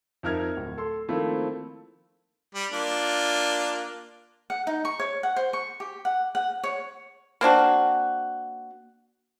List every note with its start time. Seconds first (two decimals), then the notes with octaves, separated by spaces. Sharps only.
0.23 F2 D#4 A#4 E5 F6 G#6
0.57 D1
0.78 A4 C6
1.08 D#3 F3 A3 A#3 C4 E4
2.55 G3
2.72 A#3 D4 F4
4.50 F#5
4.67 D#4
4.85 C#6
5.00 C#5
5.23 F#5
5.36 C5
5.53 C#6
5.80 G4
6.05 F#5
6.35 F#5
6.63 C#5
7.41 A#3 C4 D4 F#4